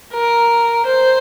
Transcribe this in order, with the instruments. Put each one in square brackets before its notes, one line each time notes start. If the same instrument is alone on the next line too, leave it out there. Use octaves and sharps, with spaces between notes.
[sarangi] A#4
C5